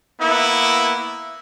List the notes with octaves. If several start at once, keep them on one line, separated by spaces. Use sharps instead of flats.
A#3 B3 E4